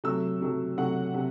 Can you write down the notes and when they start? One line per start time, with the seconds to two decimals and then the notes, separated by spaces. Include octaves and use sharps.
0.04 C3 F#3 A3 E6
0.41 C3 F#3 A3
0.78 C3 F#3 A3 F#5
1.14 C3